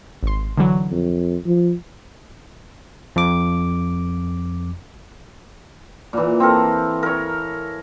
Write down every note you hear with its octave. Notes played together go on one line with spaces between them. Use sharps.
G#1 C6
D3 E3 F#3
F2
F3
F2 D6
A#2 E3
C4 A4 A#4
A#4 C#5